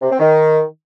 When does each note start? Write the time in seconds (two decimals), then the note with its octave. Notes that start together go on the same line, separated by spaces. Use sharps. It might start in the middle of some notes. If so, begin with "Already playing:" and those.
0.02 C3
0.11 C4
0.20 D#3